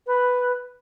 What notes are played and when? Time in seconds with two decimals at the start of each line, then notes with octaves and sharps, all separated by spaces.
0.07 B4